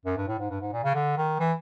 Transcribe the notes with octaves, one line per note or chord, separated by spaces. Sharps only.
F#2
G2
A2
G#2
G2
G#2
A#2
C#3
D3
D#3
E3